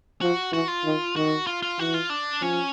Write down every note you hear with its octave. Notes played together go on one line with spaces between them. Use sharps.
F3 F#4
E3 F#4
F4
D#3
D#3 F#4
F4
F4
E3 F#4
F4
D4
F3 C#4